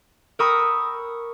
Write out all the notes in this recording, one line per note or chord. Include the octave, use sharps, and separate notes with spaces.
A#4 G5 B5 C#6 D#6 E6